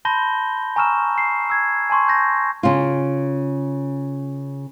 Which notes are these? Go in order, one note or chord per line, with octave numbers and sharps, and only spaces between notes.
A5 B5 C6 G6 A#6 G7
G#5 A#5 C#6 E6 F6 E7
C7
E6 G#6
G#5 A5 C6 C#6
G6 A#6
C#3 F4